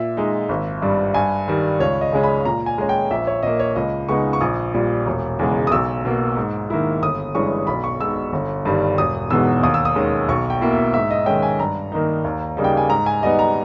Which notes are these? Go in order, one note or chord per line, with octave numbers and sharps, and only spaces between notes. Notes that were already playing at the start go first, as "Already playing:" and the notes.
Already playing: A#2 E5
G#3 D#4
G#1
G2 G3
G2 G#5
D#3 G3
C#2 C#5
D#5
C#3 G#3 C#4
B5
A#2 A#5
G#5
G#3 C#4 G#5
G5
A#1 E5
C#5
A#2 A#3 D#5
C#5
C#2 D#5
C#3 G#3 B3 D#4 C#6
C#6
A#1 D#6
A#2 G3
E1
E2 C#3 G#3
D#6
B1 E6
B2 A#3
G#2
D#3 A#3 E4
G1 D#6
G2 E3 G#3 C#4 C#6
B1 B5
C#6
B2 G#3 D#4 E6
G1
G2 D#3 G3
E1 D#6
E2 B2 G#3 D#4 E6
D#2 D#6
E6
D#6
D#3 G#3 C#4
B1 C#6
G5
B2 A#3 E4
E5
G#2 E5
D#5
D#3 G#3 C#4 G5
G#5
G2 A#5
D#3 A#3 D#4
D#2
C#3 G3 A#3 D#4
G5
G#5
G#2 A#5
G#5
G3 B3 D#4 D#5
A#5